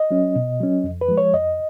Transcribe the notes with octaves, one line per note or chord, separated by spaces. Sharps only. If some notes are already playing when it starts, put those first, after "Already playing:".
Already playing: D#5
F#3 C#4
B2
F#3 C#4
F2
B4
F3 G#3
C#5
F2 D#5